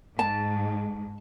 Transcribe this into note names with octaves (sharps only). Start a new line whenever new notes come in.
G#2 A5